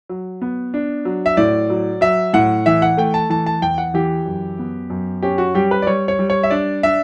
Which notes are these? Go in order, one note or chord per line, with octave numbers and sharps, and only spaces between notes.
F#3
B3
D4
F#3
E5
A2 D5
F#3
F#3 E5
A2 F#5
E3 E5
F#5
A3 G5
A5
E3 A5
A5
E2 G5
F#5
E3 G4
F#2
B3
F#2
C#4 G4
F#4
G3 G4
B4
D5
G3 C#5
C#5
G3
C#5
E5
D4 D5
D4 E5